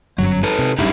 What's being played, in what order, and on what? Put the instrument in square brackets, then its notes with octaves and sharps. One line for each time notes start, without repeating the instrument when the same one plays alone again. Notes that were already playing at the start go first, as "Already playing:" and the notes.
[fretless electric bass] G1 F#2 [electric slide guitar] F#3
[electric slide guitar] D#4 A4 B4
[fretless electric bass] C3
[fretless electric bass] F#1 G2 C#3 [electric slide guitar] D#4 E4 G4